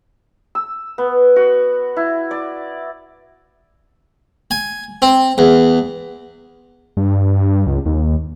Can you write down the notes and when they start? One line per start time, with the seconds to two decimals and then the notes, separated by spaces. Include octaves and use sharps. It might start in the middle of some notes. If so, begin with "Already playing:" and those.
0.55 E6
0.98 B3
1.36 F#4
1.96 E4
2.31 D5
4.51 G#5
5.02 C4
5.38 E2
6.97 G2
7.66 C#2
7.86 D#2